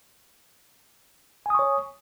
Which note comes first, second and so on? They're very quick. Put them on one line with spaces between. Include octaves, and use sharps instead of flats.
G#5 D#6 C#6 C#5